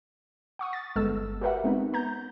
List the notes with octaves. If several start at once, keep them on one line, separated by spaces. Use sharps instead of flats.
F#5 C#6 D#6
A6
G1 G#3 B3 A4 E6
F#4 G4 A#4 B4 E5 F#5
G#3 B3 C4 D#4
B3 A#5 G6